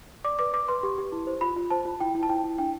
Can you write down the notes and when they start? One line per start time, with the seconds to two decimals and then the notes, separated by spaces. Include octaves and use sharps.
0.24 D5 D6
0.39 B4 D6
0.53 B4 D6
0.68 B4 C6
0.83 G4
0.98 G4
1.12 E4
1.27 C5
1.41 F4 B5
1.56 F4
1.70 C5 A5
1.85 F4
2.00 E4 G5
2.15 E4
2.23 A5
2.29 E4 G5
2.44 E4
2.58 D4 G5